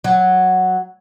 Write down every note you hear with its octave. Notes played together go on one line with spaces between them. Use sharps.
F#3